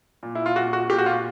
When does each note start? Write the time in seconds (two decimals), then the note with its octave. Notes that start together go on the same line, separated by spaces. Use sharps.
0.23 A#2
0.35 E4
0.46 F4
0.56 A#2 F#4
0.73 F#4
0.89 A#2 G4
0.98 F#4
1.06 F4